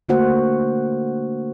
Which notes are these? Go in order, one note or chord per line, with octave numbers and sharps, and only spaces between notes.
D3 A3 A#3 F#4 C5 F#5